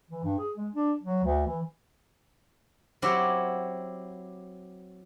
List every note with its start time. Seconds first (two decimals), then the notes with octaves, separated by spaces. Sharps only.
0.10 E3
0.24 G2
0.38 G#4
0.56 G#3
0.74 D4
1.03 F#3
1.24 D2
1.47 E3
3.02 F#3 C4 E4 G4 C#5